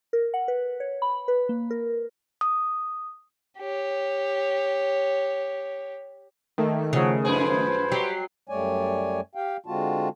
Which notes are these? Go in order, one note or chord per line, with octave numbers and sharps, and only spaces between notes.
A#4
F#5
B4
C#5
B5
B4
A#3
A#4
D#6
G4 C#5
D#3 A3 A#3
C#3 F3 F#3
F#2 F3 G#4 B4 C5
F#3 G4 C7
F#2 G3 A3 C#5 D5 G#5
G4 F5 G5
D3 G#3 C4 F4 F#4 A5